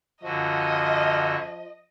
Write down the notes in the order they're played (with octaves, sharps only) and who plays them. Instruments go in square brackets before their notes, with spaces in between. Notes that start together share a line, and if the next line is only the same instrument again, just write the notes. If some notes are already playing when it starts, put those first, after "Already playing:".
[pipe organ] F#2 D3 F#4 [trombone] F3 [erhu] D#5